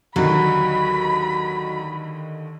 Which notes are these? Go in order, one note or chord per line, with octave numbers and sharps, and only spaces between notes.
D#2 D3 D#3 F#3 B5